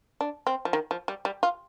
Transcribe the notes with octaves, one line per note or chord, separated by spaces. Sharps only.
D4
C4
F3
D#3
F3
G3
G3
F4